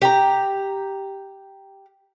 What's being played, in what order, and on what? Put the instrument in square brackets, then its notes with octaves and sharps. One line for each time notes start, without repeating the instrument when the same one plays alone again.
[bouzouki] G4 A#5